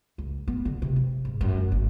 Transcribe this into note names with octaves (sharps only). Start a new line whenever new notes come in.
C#2
B3
D3
C3
E3
G#2
F#2
F1
G#1